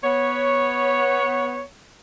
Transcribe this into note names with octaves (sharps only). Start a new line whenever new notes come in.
B3 C#5